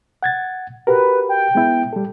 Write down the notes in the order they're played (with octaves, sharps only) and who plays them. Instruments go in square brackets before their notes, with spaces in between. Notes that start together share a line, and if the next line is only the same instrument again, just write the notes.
[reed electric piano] F#5 G#6 A6
[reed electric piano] F#4 G4 A#4 [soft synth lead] B4
[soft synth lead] G5
[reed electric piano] G#3 B3 E4
G3 A4